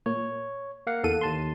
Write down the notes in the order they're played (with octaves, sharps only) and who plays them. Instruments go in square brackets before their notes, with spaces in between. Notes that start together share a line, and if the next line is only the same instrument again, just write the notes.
[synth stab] A#2 [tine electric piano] C#5
[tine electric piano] A#3 F5 F#5
[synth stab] E2 A4 D#7
[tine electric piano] D#2 A5 C6